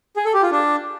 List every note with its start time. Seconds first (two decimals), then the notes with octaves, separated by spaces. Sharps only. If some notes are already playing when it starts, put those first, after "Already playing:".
0.16 G#4
0.25 A4
0.34 G4
0.42 F4
0.51 D4